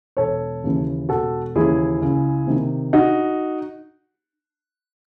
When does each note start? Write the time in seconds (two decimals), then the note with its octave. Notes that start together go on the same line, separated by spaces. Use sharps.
0.17 E1 A4 C#5
0.64 D#2 C#3 E3
1.09 E1 F#4 A4
1.55 D#2 C#3 E3 E4 G#4
2.02 C#2
2.47 C3 D#3
2.93 D#4 F#4